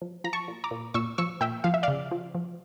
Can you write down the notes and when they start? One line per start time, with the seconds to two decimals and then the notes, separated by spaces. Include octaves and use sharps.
0.02 F3
0.24 F3 A#5
0.33 A5 C#6
0.48 A#2
0.64 A#5 D6
0.71 A#2
0.94 A#2 C#6 E6
1.18 F3 C#6 E6
1.41 A#2 E5 G5
1.64 F3 F5
1.74 E5
1.83 C#3 D5 F5
2.11 F3
2.35 F3